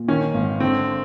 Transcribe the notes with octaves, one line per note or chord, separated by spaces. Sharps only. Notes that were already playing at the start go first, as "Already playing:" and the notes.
Already playing: A#2
D#3 C#4
G#1
D3 C4